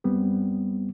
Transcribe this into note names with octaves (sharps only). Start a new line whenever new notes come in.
F#2 G3 B3 C4